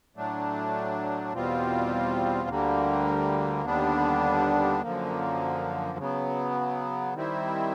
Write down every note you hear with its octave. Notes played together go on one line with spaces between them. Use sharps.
A2 F#3 A3 D4
E2 B2 G3 C4 F4
D2 D3 G3 A#3
D#2 D3 G3 B3 D4
F#2 D3 F3 A#3
C#3 F#3 B3
D#3 G3 C4 E4